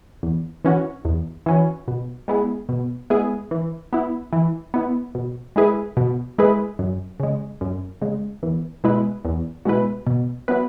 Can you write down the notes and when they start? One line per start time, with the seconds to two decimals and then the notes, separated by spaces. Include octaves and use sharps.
0.23 E2
0.65 E3 C#4 F#4
1.05 E2
1.46 E3 C#4 F#4
1.88 B2
2.28 G#3 B3 E4 G#4
2.69 B2
3.10 G#3 B3 E4 G#4
3.51 E3
3.93 B3 E4
4.33 E3
4.74 B3 E4
5.15 B2
5.56 G#3 E4 G#4 B4
5.97 B2
6.38 G#3 E4 G#4 B4
6.79 F#2
7.20 C#3 G#3
7.61 F#2
8.01 C#3 G#3
8.43 E2
8.84 B2 G#3 E4 B4
9.25 E2
9.65 B2 G#3 E4 B4
10.07 B2
10.48 F#3 B3 E4 B4